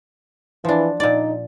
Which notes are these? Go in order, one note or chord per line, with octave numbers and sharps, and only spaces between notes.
E3 F3 D4
A#2 D#4 D5